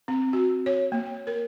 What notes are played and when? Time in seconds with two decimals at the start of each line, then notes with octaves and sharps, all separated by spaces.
0.08 C4
0.33 F#4
0.66 C#5
0.92 A#3
1.27 A#4